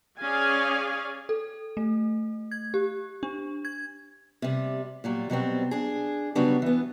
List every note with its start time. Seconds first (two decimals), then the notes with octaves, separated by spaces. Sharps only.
0.20 C#4 G#4 D5 F5 G#5
1.29 A4
1.77 A3
2.51 G#6
2.74 G4
3.23 D4
3.65 G#6
4.42 C3 G3
5.04 A#2 F#3 G3
5.30 B2 F#3 G3 C4
5.71 D4 G#4
6.35 C#3 F#3 G3 B3 D4
6.62 E3 B3